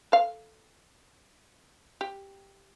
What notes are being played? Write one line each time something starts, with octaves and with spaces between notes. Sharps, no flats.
A4 F5
G4